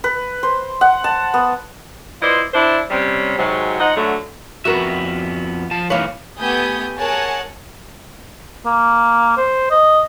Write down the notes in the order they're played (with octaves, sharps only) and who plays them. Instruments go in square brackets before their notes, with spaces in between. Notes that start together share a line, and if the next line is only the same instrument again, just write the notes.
[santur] B4
C5
F#5
A5
B3
[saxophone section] E4 F4 B4 C5 D5 D#5
D4 E4 C5
C3 G3 C#4
G#2 C3 F#3
F3 D#4 D#5 F#5
D3 F#3 A3
[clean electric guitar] F2 B3 E5 [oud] F#4 A#4 B4
[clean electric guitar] F3 A5
[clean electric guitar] E3 A#3 B4 [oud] D#4 F4 C#5
[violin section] A3 B3 G4 G#5 D#6 G6
G#4 A#4 C#5 F#5 G#5 A5
[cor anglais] A#3
C5
D#5